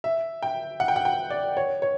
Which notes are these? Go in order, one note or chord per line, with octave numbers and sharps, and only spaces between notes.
E5
G5
F#5
G5
F#5
G5
D5
C#5
C#5